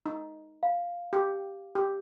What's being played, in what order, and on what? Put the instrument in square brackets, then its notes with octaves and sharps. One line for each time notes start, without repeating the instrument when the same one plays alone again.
[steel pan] D#4
[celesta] F5
[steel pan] G4
G4